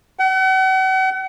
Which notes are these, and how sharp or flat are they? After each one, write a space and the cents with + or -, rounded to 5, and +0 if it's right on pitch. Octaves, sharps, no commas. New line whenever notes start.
F#5 +40